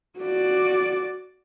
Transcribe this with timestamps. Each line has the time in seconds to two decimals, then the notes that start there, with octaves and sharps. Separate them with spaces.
0.19 F#4 D5